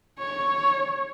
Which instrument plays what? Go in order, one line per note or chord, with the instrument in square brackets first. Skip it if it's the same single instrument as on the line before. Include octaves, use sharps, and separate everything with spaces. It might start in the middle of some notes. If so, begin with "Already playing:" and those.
[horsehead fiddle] C#5